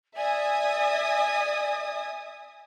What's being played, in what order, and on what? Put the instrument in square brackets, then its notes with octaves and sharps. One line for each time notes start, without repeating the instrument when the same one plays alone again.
[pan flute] D5 [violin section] E5 G#5 D#6